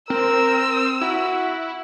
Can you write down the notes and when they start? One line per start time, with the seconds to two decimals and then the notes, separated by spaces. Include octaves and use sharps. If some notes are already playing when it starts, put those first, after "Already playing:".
0.10 C4 A#4 E6
1.01 E4 F#4